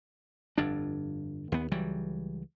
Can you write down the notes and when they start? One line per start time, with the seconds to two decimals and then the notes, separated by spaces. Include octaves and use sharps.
0.58 G1 F2 D4
1.52 D#2 B3
1.72 C#2 E3 F#3 G3